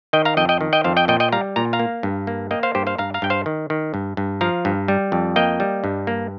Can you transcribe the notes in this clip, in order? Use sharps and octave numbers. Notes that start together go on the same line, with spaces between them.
D#3 D#5 G5
F5 A#5
F2 D#5 G5
D#5 G5
D#3
D#5 G5
F2 C5 F5
D#5 G5
A#2 D#5 G5
D#5 G5
G3 F5 A#5
A#2 A#5
F5 A#5
A#3
G2
A#3
A#3 D#5 G5
C5 F5
G2 G4 C5
C5 F5
G2 F5 A#5
F5 A#5
G2 G5
C5 F5
D#3
D#3
G2
G2
F3 F5 A#5
G2
G3
F2
A#3 D#5 G5
G3
G2
A#3